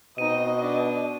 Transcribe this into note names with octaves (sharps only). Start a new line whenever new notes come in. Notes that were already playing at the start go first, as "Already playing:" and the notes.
B2 C4 D#4 D#5 D#7
D4